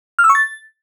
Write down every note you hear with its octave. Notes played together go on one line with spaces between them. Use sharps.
F6
E6
C#6
A6